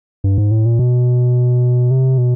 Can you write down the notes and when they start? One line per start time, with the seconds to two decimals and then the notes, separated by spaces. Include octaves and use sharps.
0.24 G2
0.38 G#2
0.51 A2
0.66 A#2
0.79 B2
1.91 C3
2.18 B2